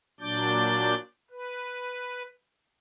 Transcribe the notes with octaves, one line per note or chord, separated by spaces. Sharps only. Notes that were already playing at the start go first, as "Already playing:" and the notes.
A#2 F#3 D4 D5 D6 G6
B4